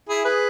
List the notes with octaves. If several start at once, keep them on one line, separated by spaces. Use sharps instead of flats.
E4 G#4
G#4 B4